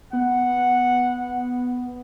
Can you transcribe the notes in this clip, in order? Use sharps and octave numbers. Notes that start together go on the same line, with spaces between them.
B3 F#5